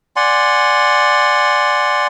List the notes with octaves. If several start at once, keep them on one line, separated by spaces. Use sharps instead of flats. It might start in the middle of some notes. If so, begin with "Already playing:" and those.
D5 F#5 G#5 C6